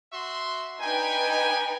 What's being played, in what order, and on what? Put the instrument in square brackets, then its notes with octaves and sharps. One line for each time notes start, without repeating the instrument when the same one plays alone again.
[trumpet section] F#4 E5 C6
[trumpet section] D4 G#5 [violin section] D#4 B4 G5